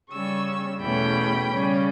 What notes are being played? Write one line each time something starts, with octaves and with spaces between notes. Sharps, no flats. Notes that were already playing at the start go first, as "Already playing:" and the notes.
C#3 G3 C#4 C#6 E6
E2 B2 A3 C#4 G5 B5
C#3 G3 C#4